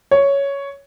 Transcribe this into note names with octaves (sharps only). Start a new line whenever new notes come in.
C#5